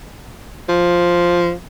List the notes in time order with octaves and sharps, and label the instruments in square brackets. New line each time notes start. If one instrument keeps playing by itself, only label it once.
[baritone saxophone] F3